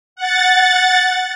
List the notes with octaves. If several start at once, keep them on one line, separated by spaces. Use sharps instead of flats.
F#5 A6